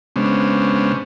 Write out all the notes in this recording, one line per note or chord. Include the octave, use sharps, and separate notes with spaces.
C#3 G#3 B3 C#4 D4 C5